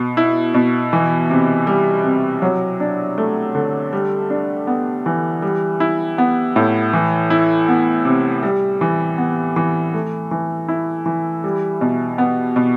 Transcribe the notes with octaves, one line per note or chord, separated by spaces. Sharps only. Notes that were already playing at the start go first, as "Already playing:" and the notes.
Already playing: B2
E4
B2
E3
C3
G3
C3
F#3
D4
A3
D3
G3
D4
B3
E3
G3
E4
B3
A2
E3
E4
B3
C3
G3
E3
B3
E3
A3
E3
E4
E3
G3
B2
B3
B2